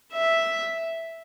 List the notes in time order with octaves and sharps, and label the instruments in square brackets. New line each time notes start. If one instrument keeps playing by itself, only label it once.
[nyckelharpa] E5